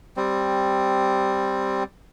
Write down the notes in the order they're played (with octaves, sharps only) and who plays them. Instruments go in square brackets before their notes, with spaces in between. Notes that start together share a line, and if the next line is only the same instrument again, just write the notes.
[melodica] G3 C4